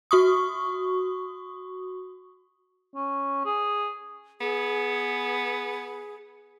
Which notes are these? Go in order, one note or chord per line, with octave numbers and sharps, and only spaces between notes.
F#4 C#6 D#6
C#4
G#4
B3 G#4